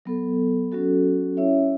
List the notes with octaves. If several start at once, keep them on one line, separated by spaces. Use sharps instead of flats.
F#3 B3 A4
F#3 C#4 F#4 A4
C#4 E4 C#5 E5